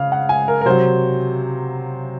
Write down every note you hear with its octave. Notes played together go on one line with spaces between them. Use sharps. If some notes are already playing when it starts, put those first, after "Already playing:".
Already playing: C#3 F5
F#5
G#5
A#4
A#4
C3 F#3 C5